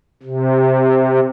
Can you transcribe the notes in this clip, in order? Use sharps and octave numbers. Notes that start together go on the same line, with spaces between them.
C3